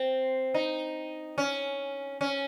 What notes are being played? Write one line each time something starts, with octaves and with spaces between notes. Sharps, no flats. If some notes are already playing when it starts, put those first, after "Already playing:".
Already playing: C4
D#4
C#4
C#4